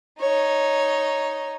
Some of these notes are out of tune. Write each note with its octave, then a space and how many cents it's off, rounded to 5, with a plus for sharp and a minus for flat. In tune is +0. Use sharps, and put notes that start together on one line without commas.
D#4 +0 C#5 +0